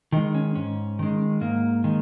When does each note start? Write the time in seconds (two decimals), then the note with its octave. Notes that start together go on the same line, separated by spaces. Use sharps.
0.12 D#3 G#3 D#4
0.35 C#4
0.55 G#2 C#4
0.99 D#3 G#3
1.41 G#2 A#3
1.84 D#3 G#3